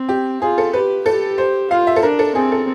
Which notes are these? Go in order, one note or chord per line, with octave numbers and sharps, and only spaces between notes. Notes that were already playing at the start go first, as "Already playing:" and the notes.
Already playing: C4
G4
F4 G#4
A4
G4 B4
G4 A4
C5
F4 F5
E5
A4
D4 A#4
A4
C4 G#4
A4